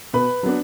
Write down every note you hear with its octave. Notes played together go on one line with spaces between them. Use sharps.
B2 B4 B5
F#3 B3 D4